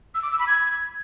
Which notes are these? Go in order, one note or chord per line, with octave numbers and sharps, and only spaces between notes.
E6
D6
E6
B5
G#6